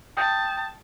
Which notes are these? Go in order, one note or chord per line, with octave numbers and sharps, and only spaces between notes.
G5 A5 D#6 G6